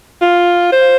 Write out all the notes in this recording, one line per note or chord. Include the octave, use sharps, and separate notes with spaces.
F4
C5